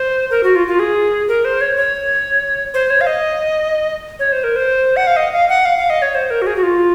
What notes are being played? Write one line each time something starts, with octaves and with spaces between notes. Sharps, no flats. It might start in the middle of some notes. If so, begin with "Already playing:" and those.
Already playing: C5
A#4
F#4
F4
F4
G#4
A#4
C5
C#5
C#5
C5
C#5
F5
D#5
C#5
C5
A#4
C5
F#5
F5
D#5
F5
F#5
F5
F5
D#5
C#5
C5
A#4
F#4
G#4
F#4
F4